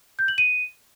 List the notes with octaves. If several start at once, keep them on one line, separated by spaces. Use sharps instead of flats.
G6
F#7
D#7